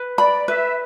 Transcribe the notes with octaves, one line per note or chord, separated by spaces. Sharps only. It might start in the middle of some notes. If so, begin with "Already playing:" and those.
Already playing: B4
D5 B5
B4 E5